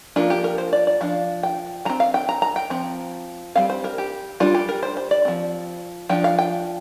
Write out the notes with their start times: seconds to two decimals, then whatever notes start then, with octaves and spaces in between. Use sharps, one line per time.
0.16 F3 A#3 D4 F4
0.30 G4
0.44 A#4
0.58 C5
0.73 D5
0.87 D5
1.01 F3 D4 F5
1.43 G5
1.85 F3 C4 A#5
2.00 F5
2.14 G5
2.29 A#5
2.42 A#5
2.56 G5
2.70 F3 C4
3.55 G3 C4 F5
3.70 C5
3.84 A#4
3.98 G4
4.40 G3 D4 F4
4.54 G4
4.69 A#4
4.83 C5
4.97 C5
5.11 D5
5.25 F3 C4
6.09 F3 D4 G5
6.24 F5
6.38 G5